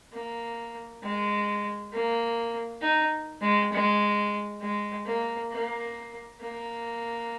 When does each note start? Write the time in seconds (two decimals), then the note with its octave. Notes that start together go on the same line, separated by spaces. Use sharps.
0.13 A#3
1.03 G#3
1.92 A#3
2.82 D#4
3.42 G#3
3.72 G#3
4.61 G#3
5.06 A#3
5.52 A#3
6.41 A#3